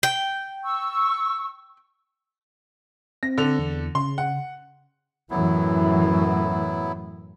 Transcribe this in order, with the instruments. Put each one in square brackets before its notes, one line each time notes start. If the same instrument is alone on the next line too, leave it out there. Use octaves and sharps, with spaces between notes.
[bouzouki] G5
[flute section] C#6 E6
[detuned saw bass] C4 [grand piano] A#6
[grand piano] D3 A4 F7
[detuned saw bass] E2
[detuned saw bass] C#3 [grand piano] C6
[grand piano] F#5
[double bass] F#2 A2 [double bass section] E3 [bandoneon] F#3 B3 E4